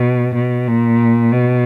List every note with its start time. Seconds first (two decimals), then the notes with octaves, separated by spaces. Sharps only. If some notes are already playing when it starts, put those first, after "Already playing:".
Already playing: B2
0.35 B2
0.67 A#2
1.32 B2